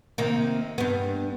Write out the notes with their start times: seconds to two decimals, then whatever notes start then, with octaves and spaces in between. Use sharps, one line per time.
0.18 C3 D#3 A#3
0.78 G2 B3